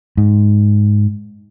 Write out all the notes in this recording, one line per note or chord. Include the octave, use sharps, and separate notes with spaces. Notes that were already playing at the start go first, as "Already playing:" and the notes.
G#2